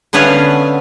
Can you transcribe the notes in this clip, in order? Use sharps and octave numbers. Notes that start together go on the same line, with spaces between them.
D3 B3 C#4 B4 E5 F5